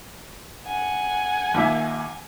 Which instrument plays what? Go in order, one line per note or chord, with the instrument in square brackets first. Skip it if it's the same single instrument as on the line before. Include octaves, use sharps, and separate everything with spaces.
[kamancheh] F#5 G#5
[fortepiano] D#2 A#2 E5